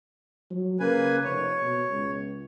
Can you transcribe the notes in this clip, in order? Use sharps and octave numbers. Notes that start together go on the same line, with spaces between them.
F#3
C#3 A#3 B4 G#5
F1 C#5
B2
C#2